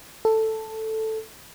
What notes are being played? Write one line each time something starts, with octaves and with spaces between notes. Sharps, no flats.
A4